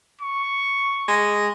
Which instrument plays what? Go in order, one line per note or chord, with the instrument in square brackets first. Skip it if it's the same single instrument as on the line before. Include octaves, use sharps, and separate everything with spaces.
[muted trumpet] C#6
[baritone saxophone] G#3